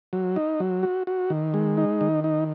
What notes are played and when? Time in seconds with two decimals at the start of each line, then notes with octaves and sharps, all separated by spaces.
0.13 F#3
0.36 D#4
0.60 F#3
0.83 F#4
1.07 F#4
1.30 D#3
1.54 G#3
1.77 D#4
2.01 D#3
2.24 D#4